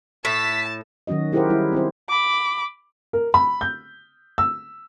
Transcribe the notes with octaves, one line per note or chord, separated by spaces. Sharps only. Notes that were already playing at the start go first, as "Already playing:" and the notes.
A2 A5 B6
D#3 F#3 C#4 F#4 D#5
E4 G4 G#4 A#4 C5 F#5
G3 E4
C4 E4 C5
B5 D6
A#4
B5
G6
E6